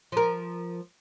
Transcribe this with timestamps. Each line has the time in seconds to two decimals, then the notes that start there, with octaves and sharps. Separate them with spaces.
0.12 F3 A#4